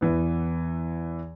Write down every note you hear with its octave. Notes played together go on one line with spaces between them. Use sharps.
E2 E3 B3